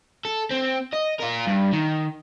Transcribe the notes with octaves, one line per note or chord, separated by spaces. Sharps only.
A4
C4
D#5
F4 A#4
G2
D#3